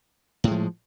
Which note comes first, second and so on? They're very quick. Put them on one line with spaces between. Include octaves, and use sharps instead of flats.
A2 G#3 F3